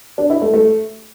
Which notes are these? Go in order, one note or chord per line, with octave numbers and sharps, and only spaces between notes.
D4
E4
A3
A3